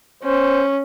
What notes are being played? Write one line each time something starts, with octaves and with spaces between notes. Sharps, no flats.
C#4 C5